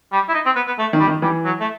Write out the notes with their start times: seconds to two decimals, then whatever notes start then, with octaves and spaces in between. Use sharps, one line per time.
0.12 G3
0.29 E4
0.34 D#4
0.46 C4
0.56 B3
0.67 B3
0.78 A3
0.93 D#3
1.00 G3
1.07 D#3
1.22 E3 G3
1.44 F#3
1.60 A3